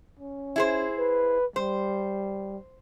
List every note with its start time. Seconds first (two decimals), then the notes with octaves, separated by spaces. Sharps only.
0.19 C#4
0.56 E4 G#4 C5
0.98 B4
1.56 G3 C5